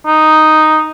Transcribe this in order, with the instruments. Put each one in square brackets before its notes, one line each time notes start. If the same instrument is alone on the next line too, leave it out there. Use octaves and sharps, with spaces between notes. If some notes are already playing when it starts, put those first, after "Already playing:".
[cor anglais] D#4